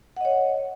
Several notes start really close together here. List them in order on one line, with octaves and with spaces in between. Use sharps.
F#5 D#5 C#5